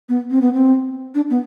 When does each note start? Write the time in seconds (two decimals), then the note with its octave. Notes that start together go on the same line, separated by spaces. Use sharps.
0.09 B3
0.30 C4
0.41 B3
0.53 C4
1.15 D4
1.30 B3